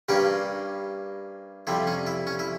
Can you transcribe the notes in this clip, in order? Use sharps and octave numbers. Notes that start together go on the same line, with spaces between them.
G2 G3 A#3 C#4 G4
F2 C3 G3 E4
C#4
E4
C#4
E4